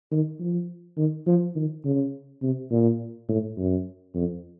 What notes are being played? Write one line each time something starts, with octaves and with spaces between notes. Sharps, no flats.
D#3
F3
D#3
F3
D#3
C#3
C3
A#2
A2
F#2
F2